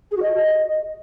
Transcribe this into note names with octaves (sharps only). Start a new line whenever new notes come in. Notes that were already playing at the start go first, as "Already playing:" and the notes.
G#4
F#4
D#5